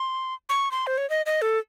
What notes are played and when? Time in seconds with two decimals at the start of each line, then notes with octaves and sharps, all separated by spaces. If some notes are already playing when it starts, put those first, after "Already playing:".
Already playing: C6
0.49 C#6
0.71 C6
0.87 C5
0.98 C#5
1.10 D#5
1.26 D#5
1.42 A4